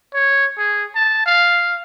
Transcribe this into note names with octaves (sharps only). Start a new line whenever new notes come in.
C#5
G#4
A5
F5